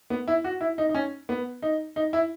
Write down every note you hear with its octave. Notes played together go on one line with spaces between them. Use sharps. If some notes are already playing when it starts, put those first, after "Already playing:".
B3
E4
F#4
E4
D#4
D#4
C#4
B3
D#4
D#4
E4